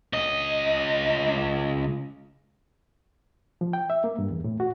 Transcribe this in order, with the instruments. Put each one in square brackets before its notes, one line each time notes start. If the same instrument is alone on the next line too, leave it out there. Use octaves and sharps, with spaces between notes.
[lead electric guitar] C#2 D#5
[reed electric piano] F3
G5
E5
A#3
G2
E2
A2
F#4